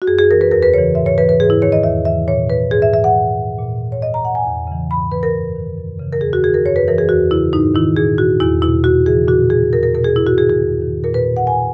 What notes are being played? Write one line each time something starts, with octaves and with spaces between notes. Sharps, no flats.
F#4
F#2 G#4
G#4
E3 A#4
B4
E2 A#4
B4
C#3 E3 C#5
G#2 E5
C#5
E3 B4
B4
G#2 G#4
E4
D#3 C#5
D#5
E2 E5
C#3 E3 E5
A#2 C#5
B4
G#2 G#4
E5
E3 E5
F#5
A#2
A#2
C#5
A#2 D#5
A#5
F#5
G#5
E2
C#3 E3
G#2 B5
E3 B4
A#4
F#2
D#3
F#2
C#3 E3
A#4
E2 G#4
F#4
D#3 G#4
A#4
F#2 C#5
B4
E3 A#4
G#4
E2 F#4
C#3 E3 E4
G#2 D#4
D#3 E4
A#2 G#4
F#4
E2 E4
B2 E4
E2 F#4
C#3 E3 G#4
A#2 F#4
G#4
E2 A#4
A#4
B2 A#4
G#4
G#2 E4
F#4
D#3 G#4
G#4
E2
D#3
A#2 A#4
B4
F#5
A#2 G#5